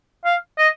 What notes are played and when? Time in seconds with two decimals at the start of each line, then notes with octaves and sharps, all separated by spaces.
0.25 F5
0.58 D#5